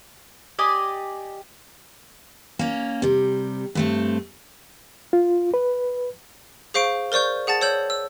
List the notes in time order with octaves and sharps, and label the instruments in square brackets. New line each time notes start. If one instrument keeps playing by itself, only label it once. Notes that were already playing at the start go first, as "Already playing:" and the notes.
[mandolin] G4 D5 D#5 G#5
[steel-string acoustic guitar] A#3 C#4
C3 G3
G2 A3 C4
[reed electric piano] F4
B4
[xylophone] G#4 C5 F5 C#6 D7
A#4 C5 D5 C#6 G6
G#4 F#5 A5 A6
C#5 E6 G6 F#7
E6